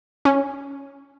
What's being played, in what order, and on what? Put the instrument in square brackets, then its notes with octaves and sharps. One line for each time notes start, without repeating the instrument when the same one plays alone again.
[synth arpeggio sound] C#4